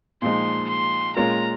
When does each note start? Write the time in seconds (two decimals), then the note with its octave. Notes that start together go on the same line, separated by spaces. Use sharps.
0.22 A#2 F3 G#3 D#4 C6
0.69 C6
1.16 A#2 G#3 C#4 F4 A#4 A#5